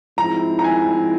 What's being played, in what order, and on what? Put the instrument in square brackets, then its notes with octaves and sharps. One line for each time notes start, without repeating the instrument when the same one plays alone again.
[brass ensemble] G#2 F3 C4 E4 [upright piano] A#5
[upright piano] A#5
G#5